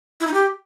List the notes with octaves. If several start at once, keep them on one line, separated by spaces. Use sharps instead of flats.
E4
D#4
G4